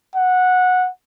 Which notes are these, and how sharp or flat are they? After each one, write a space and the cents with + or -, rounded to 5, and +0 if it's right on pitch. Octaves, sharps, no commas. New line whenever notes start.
F#5 -15